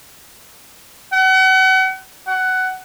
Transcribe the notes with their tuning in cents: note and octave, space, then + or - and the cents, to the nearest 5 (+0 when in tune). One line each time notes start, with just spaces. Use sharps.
F#5 +35
F#5 +15